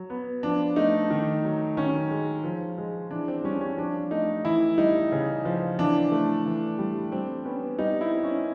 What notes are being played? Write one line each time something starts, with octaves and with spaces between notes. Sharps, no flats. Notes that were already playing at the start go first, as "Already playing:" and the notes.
Already playing: F#3
B3
F3 D4
A3 D#4
D#3
F#3
D#3 C#4
G#3
F3
G#3
E3 D4
C4
G3 C#4
C#4
F3 D4
A3 D#4
E3 E4
G3 D#4
C#3
F3
E3 D4
A3
E3
G3
G3 C4
B3 C#4
G3 D#4
E4
C4
C#4